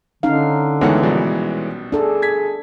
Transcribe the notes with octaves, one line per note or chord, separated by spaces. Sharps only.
D3 C#4 D#4 F5
D2 D#3 E3 G#3 B3 C#5 F#5
A#1 B2 G3
D4 G#4 A4
G#6 B6